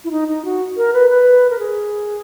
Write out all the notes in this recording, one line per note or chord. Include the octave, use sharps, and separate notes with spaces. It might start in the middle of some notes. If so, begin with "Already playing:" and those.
E4
D#4
D#4
F#4
A#4
B4
B4
A#4
G#4